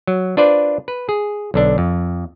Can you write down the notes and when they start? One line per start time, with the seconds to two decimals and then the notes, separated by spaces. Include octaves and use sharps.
0.07 F#3
0.37 D4 F4 B4 C5 D5
0.88 B4
1.09 G#4
1.54 B1 D3 D4
1.78 F2